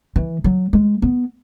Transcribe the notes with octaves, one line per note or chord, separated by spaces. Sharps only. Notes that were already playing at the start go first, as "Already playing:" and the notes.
E3
F#3
G#3
B3